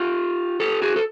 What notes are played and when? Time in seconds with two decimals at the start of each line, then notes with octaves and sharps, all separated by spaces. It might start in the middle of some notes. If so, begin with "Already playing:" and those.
Already playing: F4 G4
0.60 G4 A4
0.82 F#4 G#4
0.96 A4